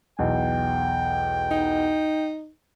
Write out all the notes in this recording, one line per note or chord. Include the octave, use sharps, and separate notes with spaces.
B1 E2 G5
D#4